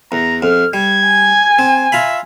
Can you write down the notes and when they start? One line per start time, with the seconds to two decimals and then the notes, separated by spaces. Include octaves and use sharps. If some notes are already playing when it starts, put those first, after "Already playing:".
0.12 E2 A#5
0.42 F2 F6
0.73 G3 G#6
1.07 G#5
1.59 C4
1.92 F4 E5 A#5 B5